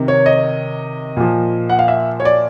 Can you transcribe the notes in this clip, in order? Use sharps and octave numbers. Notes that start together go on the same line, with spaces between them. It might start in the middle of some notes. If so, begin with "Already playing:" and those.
Already playing: C3 D#3
C#5
D#5
A#2 F3
F#5
F5
E5
C#5
D5